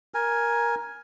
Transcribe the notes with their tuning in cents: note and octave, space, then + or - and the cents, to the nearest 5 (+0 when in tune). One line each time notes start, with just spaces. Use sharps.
A#4 +10 G#5 +0